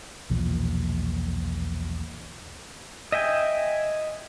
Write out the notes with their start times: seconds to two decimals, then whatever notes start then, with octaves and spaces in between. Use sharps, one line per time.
0.30 B1 E2 A#2 F3
3.12 D#5 E5 G5 G#5